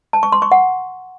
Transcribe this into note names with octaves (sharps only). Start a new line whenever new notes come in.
A5
C#6
C6
C#6
F#5